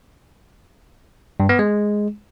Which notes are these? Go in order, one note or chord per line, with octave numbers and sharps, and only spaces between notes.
G2
B3
G#3